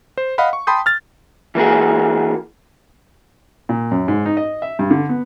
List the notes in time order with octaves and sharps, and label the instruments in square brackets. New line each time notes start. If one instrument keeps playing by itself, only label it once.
[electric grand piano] C5
D#5 F5 F#5 B5
C#6
G5 A5 B5 C6 D#6 G6
F6 A6
[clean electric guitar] E3 A#3 F#4 G#4
[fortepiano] A#2
F#2
G#2
D#4
D#5
E5
G2
D3
B3